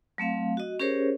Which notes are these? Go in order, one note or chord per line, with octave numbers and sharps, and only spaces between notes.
F#3 A3 C4 F5
F#4 D#5
C#4 G4 G#4 A#4 C5 C#5